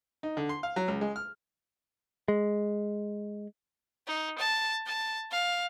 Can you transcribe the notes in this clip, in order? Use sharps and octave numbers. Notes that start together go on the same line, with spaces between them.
D#4
D3
C6
F5
F#3
C#2
G#3
F6
G#3
D#4
A5
A5
F5